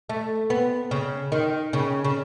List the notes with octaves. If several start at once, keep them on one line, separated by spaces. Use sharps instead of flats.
A3
B3
C#3
D#3
C#3
C#3